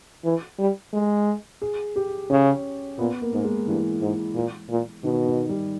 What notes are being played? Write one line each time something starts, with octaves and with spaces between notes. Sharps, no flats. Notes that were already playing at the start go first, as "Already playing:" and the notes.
E3
G3
G#3
G#4
G4
C#3 C#4
A#2 B3
A#3
G#2 A#3
G#3
G2 E3
G#2
A#2
A#2
B2 D#3
D#3
G3